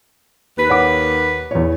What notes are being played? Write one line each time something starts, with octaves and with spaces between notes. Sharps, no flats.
D#2 B4
C#5 F#5 D6
E2 C#5